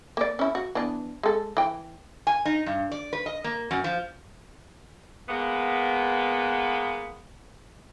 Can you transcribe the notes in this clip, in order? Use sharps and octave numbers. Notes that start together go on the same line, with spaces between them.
A#3 D5
C#4 E4
F#4
E3 B3 D4
G#3 A4
E3 G5
G#5
D#4
G2
D5
B4
D#5
A#3
F#2
F3
G#3 A#3 B3